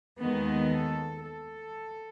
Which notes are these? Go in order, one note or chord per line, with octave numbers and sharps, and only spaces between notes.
D#2 D#3 G#3 B3
A4
A4